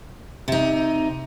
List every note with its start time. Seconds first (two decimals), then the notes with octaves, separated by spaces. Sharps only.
0.48 C3 D#4